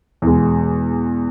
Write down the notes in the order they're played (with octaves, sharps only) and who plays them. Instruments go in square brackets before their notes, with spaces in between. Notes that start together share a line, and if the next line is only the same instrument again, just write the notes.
[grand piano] E2 B2 G#3